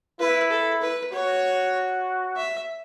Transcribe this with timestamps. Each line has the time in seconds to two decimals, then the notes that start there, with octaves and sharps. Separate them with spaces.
0.20 E4 B4
0.51 A4
0.82 B4
1.13 F#4 C#5
2.36 E5